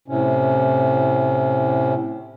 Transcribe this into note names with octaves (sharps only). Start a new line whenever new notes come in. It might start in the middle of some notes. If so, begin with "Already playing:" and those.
A2 C3 C#4